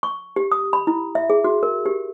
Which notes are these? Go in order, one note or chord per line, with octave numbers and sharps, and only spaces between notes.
C#6
G4
D#6
B5
E4
E5
G#4
F#4
A#4
G4